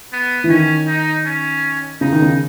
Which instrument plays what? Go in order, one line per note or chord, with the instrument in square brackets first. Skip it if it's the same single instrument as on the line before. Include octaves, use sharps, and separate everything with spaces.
[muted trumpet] B3
[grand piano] E3
[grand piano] D#3 [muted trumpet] C#4
[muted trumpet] D#4
C#4
[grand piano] C#3 [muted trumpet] D#4
[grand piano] D#3
C#3